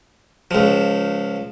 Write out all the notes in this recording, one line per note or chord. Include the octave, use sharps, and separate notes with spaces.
C#2 F3